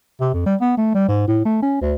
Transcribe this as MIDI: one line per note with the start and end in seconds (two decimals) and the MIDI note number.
0.21 0.29 48
0.34 0.46 41
0.46 0.55 55
0.61 0.77 59
0.78 0.90 57
0.95 1.08 55
1.09 1.24 44
1.28 1.41 45
1.45 1.58 57
1.63 1.79 61
1.82 1.95 38